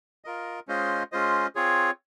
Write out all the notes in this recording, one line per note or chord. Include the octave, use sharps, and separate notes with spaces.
F4 A#4 D#5
G#3 C#4 F4 C5 D#5
G#3 C#4 F4 C5 D#5
C4 F4 G#4 C#5